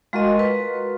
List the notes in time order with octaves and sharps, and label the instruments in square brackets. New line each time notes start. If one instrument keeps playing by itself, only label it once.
[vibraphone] G#3 D#5 [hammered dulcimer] F4 F#4 A#4
[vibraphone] B4